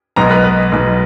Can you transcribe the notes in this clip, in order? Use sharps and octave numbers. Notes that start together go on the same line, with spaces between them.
B1 B2 G#3 A#5
B4
B4
B1 B2 G#3